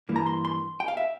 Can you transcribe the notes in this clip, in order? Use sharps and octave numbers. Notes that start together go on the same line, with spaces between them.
G2 E3 A#3
A#5
C6
C6
G5
F5
E5